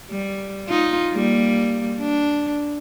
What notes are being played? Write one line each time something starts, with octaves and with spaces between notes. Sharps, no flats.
G3
D#4 F4
G3 A#3
D4